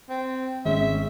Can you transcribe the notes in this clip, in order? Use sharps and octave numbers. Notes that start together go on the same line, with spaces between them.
C4
G#1 G#3 C#4 E5